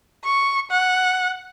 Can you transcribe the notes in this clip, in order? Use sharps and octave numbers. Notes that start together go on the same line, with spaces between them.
C#6
F#5